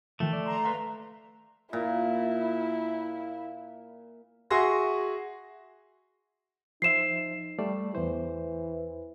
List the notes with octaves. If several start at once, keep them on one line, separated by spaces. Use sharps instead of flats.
D#3 F3 A3
D5
A#5 C6
B4 E5 F5
A#2 E4
F#4 G#4 E5 C6 A#6
F3 D#4 C5 E5 C7 E7
G3 A3 D5
E2 E3 C5